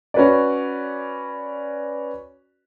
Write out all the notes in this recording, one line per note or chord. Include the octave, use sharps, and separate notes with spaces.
C#4 F#4 B4 C#5 D5